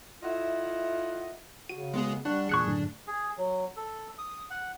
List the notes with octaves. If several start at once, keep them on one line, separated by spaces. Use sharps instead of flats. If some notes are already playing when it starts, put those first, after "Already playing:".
E4 F4 A4 D#5 E5 F#5
C#3 F#4 D#7
G#3 B3 G#4
G3 D4 F#5 C#6 F#6
E2 A#2 G#4 C#6 F#6 C#7
F#2 A2 D3
G#4
F#3
A4
D#6
F#5